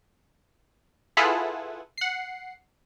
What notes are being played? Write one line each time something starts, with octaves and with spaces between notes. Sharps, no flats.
E4 F4 G#4 A4 B4 F#5
F#5 C7